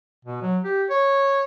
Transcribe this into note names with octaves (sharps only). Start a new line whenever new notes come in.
B2
F#3
G4
C#5